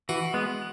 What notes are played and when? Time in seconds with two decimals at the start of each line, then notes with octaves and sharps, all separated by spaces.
0.09 E3 F#4
0.34 G#3 B3